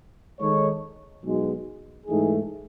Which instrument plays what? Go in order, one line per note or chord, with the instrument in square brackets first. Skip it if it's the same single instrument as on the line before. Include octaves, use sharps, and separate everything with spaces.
[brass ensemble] D#3 G#3 D#4 A4 C#5
B1 B2 G#3
G#2 E3 A3 D#4 G#4